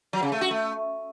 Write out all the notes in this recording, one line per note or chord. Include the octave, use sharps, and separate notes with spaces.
F#3
C#3
A3
F#4
A3